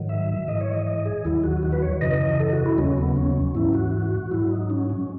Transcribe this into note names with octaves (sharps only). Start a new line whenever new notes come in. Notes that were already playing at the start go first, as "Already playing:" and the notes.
Already playing: G#2 D#3 F#3
E5
G#2 E3 D#5
C#5
D#5
D#5
G#4
D#2 D#3 F#3 E4
F#4
F#4
B4
C#5
F#2 C#3 E3 D#5
A4
F#4
E4
D#2 C#3 F#3 C#4
B3
C#4
G#2 E3 E4
F#4
G#2 F#3 E4
D#4
C#4
C#4